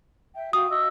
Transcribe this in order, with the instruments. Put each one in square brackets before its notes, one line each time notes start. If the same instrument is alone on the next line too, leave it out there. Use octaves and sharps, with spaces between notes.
[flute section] E5 G5
[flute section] F#4 F5 G5 [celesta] D#6
[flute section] F#4 D#5 E6